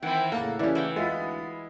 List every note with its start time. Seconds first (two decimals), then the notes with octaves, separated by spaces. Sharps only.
0.03 D#3 E3 C4 E5 F#5 G5
0.32 A2 C#3 A#3 A4 F5 F#5 A#5
0.59 C#3 E3 A3 C#4 E4 G4 D5
0.75 E3 E5 F#5 G5
0.96 D2 G#3 B3 E4 F4